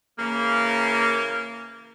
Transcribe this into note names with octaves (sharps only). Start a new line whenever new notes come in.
C#3 E3 A#3